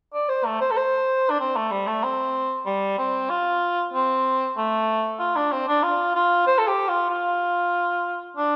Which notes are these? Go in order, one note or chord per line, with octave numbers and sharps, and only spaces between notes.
D5
C5
A3
C5
A4
C5
D4
C4
A3
G3
A3
C4
G3
C4
F4
C4
A3
F4
D4
C4
D4
F4
F4
C5
A4
G4
F4
F4
D4